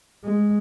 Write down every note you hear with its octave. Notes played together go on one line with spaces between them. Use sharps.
G#3